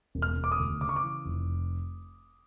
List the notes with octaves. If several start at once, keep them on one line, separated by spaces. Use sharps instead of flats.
E1
F6
E1
D6
D#6
D2
C#3 D6
C#6
D6
E3
F1